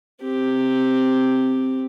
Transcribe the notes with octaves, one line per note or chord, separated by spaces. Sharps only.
C4 G4